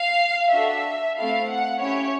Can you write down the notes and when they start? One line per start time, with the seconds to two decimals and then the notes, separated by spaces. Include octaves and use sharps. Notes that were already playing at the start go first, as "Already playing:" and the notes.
Already playing: F5
0.52 D4 F#4 A4 E5
1.16 A3 C4 E4 A4 F5
1.48 F#5
1.80 C#4 E4 G4 C#5